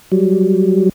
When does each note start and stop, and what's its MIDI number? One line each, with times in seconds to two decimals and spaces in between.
0.12 0.89 54
0.12 0.89 55